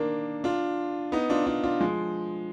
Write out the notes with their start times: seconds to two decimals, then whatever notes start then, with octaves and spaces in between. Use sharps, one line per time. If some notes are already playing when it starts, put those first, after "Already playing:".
Already playing: D#3 A#3 D4
0.44 D4 F4
1.12 B3 D#4
1.30 D4 F4
1.47 D4 F4
1.63 D4 F4
1.81 F3 G#3